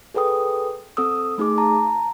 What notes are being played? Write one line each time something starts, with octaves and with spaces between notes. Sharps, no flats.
G#4 A4 B4 G5 D#6
C4 A4 D#6 E6
A3 D#4 G#4 D6
A5 A#5